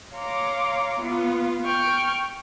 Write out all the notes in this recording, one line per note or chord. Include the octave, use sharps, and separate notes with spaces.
C#5 F5 A#5 C6 D6
B3 F4
G5 C#6 F6